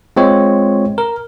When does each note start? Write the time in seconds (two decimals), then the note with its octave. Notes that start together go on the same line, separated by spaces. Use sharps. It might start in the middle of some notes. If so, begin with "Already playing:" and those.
0.17 G#3 C4 F4 C#5
0.98 A#4